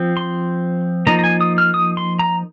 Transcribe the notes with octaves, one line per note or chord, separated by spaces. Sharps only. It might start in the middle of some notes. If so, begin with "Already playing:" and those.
Already playing: F3 C4
C6
F3 A#3 D#4 A#5
A#5
G#5
D#6
F6
D#6
C6
A#5